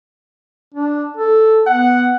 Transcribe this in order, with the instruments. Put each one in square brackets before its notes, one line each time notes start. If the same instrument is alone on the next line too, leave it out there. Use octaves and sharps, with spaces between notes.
[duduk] D4
A4
[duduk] B3 [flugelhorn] F#5